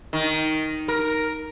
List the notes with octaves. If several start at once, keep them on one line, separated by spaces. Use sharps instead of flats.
D#3
A#4